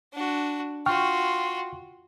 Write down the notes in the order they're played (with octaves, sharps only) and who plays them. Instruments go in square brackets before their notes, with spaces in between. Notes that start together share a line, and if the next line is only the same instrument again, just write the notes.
[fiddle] D4 F#4
[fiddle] F4 F#4 [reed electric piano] G5 C#6 F6